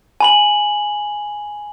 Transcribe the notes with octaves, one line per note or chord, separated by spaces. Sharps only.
G#5 B5 F#7